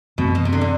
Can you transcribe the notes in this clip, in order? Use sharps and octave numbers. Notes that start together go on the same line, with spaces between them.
F#2 B2 E3 A3 C4
B2
C3
D3
C3